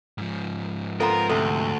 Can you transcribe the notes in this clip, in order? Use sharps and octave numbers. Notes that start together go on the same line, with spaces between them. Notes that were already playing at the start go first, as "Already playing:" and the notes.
G#2 F3
B3 C4 F4 A4 A#4 A#5
D2 C3 A4